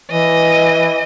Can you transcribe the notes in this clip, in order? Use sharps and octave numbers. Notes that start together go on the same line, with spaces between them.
E3 D#5